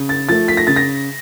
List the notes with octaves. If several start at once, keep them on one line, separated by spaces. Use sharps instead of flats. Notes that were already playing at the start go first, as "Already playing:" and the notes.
Already playing: C#3
A6
F3 A3 A6
B6
A#6
C#3 A6
A#6